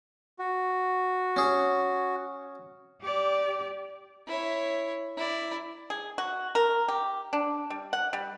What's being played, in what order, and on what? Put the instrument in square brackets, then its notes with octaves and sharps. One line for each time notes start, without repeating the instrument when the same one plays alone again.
[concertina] F#4
[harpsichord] C#4 G#4
[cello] G4 D5
[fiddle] E4 C#5
E4 D5
[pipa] G#4
F#4
A#4
G4
D4
G3
F#5
G3